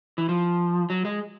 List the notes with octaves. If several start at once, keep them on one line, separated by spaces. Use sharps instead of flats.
E3
F3
F#3
G#3